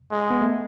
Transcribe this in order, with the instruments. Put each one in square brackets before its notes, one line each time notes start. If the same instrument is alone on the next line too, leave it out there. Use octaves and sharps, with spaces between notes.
[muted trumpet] G#3
[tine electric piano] B3
A3